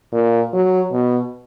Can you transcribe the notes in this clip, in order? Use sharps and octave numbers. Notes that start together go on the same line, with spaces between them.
A#2
F#3
B2